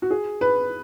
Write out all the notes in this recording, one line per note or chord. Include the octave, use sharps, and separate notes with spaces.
F#4
G#4
B4